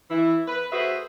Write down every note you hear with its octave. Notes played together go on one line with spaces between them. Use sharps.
E3 E4
B4
A3 F#4 G#4 B4 C5 E5